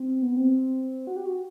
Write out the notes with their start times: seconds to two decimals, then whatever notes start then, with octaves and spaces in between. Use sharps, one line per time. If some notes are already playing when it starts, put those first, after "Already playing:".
Already playing: C4
0.22 B3
0.37 C4
1.07 F#4
1.16 G4
1.26 F#4